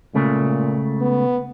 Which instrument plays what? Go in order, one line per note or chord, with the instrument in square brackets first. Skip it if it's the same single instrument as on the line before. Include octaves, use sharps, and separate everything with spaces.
[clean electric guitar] C#2 C#3 A3 [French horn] A#2
[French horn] B3